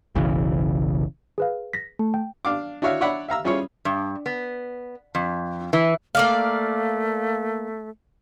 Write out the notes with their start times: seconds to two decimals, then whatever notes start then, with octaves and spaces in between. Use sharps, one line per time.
0.15 F#1 B1 C#3 E3
1.38 G#4 B4 F5
1.73 A#6 B6
1.99 A3
2.14 G5
2.45 D4 F5 D6
2.82 D4 E4 F#4 C#5 E5 F5
3.01 D4 C#5 D5 E5 F#5 B5
3.29 E5 F5 A#5 E6
3.44 G3 C#4 E4 F4 G#4 C#5
3.85 G2
4.26 B3
5.15 F2
5.73 E3
6.15 A3 A#3 D5 F5